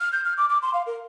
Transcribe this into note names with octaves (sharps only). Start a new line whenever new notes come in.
F6
G6
F6
D6
D6
C6
F5
A#4